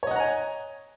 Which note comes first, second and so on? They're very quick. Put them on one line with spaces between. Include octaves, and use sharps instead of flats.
C#5 D#5 F#5 A#5 G#5